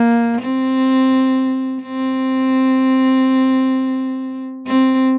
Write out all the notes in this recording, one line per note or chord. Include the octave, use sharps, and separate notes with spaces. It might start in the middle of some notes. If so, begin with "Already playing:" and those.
Already playing: A#3
C4
C4
C4